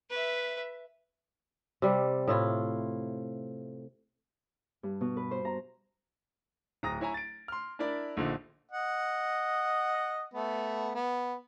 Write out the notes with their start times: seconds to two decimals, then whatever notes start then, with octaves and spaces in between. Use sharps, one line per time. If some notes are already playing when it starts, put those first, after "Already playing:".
0.10 B4 E5
1.82 C3 G3
2.28 A2 E4 F4
4.83 G2
5.01 B2
5.17 B4
5.31 C5
5.45 A#5
6.83 D1 A#5 D#6 A#6
7.01 E4 C#5 G#5 A#5
7.14 A6 D7
7.48 C6 F6
7.79 D4 E4 A#4 D5 B5
8.17 A#1 A#2 D3 D#4
8.70 D#5 F#5
10.34 A3 B3
10.95 B3